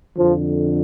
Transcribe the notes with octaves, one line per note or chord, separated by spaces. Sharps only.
F2 D3 F3